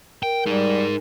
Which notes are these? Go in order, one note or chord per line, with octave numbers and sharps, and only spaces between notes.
A#4 G5
G3 D#4 G#4